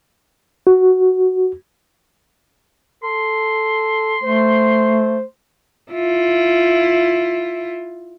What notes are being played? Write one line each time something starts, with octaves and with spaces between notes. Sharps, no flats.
F#4
A4 C6
A3 C5
E4 F4